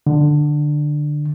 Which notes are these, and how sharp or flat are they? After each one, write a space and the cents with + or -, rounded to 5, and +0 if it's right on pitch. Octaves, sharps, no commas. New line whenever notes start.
D3 +15